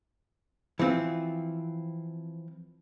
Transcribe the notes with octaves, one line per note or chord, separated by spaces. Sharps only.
E3 F3 C4